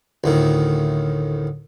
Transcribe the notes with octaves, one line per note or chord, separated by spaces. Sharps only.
D2 A2 D#3